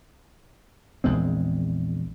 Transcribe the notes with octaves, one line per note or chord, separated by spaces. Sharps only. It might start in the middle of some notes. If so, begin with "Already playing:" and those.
A#1 E2 G#3 C4